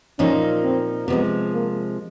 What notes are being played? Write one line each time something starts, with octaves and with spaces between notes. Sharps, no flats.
A#2 F3 A#3 C#4 D#4
C4
C3 F3 G#3 B3
A#3